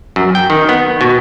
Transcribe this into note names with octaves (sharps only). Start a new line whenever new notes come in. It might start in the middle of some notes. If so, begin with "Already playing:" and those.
F#2
G5
D#3
B3
B2